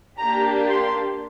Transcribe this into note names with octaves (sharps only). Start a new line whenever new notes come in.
A#3 D4 G4 A#5
C6